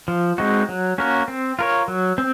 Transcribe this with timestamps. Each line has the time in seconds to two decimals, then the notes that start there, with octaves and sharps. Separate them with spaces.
0.08 F3
0.38 G#3 C4 D#4 F#4
0.69 F#3
0.98 A#3 C#4 F#4 A#4
1.28 C4
1.59 F4 A#4 C#5
1.88 F#3
2.18 C4